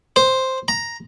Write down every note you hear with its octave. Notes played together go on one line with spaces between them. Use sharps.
C5
A#5